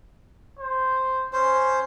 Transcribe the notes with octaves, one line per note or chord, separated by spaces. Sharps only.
C5
C#4 C5